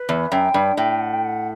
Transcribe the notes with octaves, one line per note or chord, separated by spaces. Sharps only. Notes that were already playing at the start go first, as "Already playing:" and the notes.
Already playing: B4
E2
F#2 G5
G2
A2 G5
F#5
G5
F#5